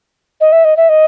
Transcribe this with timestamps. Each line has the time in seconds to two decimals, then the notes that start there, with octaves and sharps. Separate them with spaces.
0.41 D#5
0.52 E5
0.65 D#5
0.77 E5
0.89 D#5